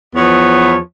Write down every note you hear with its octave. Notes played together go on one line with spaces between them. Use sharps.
E2 F3 B3 C#5